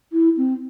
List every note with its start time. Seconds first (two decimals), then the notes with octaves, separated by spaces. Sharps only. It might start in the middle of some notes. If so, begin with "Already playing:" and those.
0.13 E4
0.37 C4